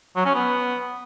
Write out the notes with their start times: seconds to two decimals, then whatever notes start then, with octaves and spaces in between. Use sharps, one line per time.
0.16 F#3
0.26 C#4
0.35 B3